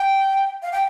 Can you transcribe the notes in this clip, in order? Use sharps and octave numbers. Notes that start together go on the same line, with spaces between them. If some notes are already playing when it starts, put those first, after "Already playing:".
Already playing: G5
F5
G5